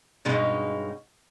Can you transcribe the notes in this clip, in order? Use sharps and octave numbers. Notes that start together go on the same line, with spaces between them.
G2 B2 G#3 C#4 D#4